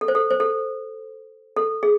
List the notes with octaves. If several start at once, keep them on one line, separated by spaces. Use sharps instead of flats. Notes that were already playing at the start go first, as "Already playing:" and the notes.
A4
C5
A4
C5
A4
A4
G#4